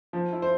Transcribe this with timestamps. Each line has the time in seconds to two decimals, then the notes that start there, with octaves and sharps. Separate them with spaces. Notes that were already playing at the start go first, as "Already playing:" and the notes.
0.13 F3
0.33 E4
0.42 C5